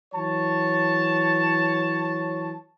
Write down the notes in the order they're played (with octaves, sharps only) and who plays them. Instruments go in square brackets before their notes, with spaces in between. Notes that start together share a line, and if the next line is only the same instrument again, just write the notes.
[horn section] E3 F#3 C#5 A5